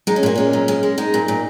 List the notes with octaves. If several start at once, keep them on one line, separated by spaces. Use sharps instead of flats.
G#3 D#4
C#4
A#2 A#3
G#3 C#4
A#2
G#3
G#3
G#3 D#4
A#2
A#2